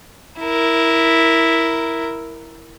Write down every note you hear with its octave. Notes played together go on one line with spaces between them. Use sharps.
E4 A#4